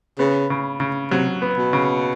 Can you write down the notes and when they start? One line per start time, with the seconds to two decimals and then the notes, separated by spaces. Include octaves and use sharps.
0.19 C#3 B3
0.50 C#3
0.80 C#3
1.11 C3 F#3
1.42 B3
1.58 B2
1.73 C#3